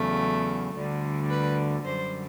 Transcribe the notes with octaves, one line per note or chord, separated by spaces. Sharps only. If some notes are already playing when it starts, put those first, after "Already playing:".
Already playing: E2 C#3 F#3 A3
D2 D3 G3
B4
F#2 D3 G3 C5